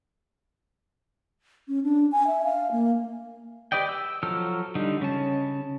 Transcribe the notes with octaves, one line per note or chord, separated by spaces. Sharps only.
C#4
D4
G#5
E5
F5
A#3
G4 B4 D5 D#5 G5
E6
F3 F#3 A4 E6 F6
D3 G3 D#4
C#3 C#4 A5